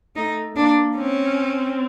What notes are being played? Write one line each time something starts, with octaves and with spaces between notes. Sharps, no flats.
A3 D#4
A#3 D4
C4 C#4